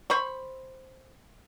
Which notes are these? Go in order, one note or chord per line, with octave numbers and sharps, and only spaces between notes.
C5 B5 C#6